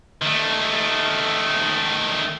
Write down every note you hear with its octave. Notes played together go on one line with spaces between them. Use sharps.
D#3 A3